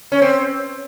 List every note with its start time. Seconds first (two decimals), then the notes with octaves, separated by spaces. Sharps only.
0.12 C#4
0.22 C4